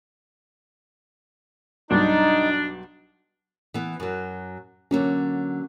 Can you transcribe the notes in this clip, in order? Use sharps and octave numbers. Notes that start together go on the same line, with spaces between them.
B1 G2 D4 D#4
E3 B3
F#2 F#3
D3 F#3 A#3 C#4